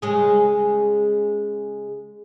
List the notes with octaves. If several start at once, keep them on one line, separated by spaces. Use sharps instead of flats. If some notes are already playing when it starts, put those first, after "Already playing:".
C#3 G#3 G#4